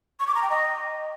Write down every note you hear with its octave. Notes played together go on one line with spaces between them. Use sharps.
C#6
D6
A#5
G5
D#5